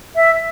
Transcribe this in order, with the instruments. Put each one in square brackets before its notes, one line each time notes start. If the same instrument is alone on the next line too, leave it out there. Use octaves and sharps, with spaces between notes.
[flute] E5